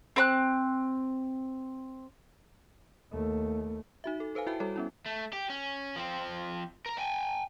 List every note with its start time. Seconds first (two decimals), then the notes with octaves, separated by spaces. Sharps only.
0.16 C4 B5 F#6
3.11 D#2 A3
4.04 D#4 F#4 E5
4.20 A4
4.35 A4 B4 C5 F5 G#5
4.47 E4 F#4 E5 G5 A5
4.60 G3 F#4 A4 C#5
4.76 B3 C#4 E4
5.06 A3
5.33 G4
5.50 C#4
5.96 F3 C4
6.86 A#4 A#5
6.98 G5 G#5